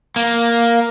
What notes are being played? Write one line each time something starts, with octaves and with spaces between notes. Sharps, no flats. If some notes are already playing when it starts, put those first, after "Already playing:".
A#3